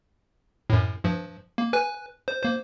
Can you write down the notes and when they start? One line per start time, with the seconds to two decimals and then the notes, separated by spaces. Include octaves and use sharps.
0.70 F#2 A2
1.04 G2 F3
1.58 A#3
1.73 B4 G#5 F#6
2.28 C5
2.43 A#3 C5